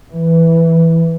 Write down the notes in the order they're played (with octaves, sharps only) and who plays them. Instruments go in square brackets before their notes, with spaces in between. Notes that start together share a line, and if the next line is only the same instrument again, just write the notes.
[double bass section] E3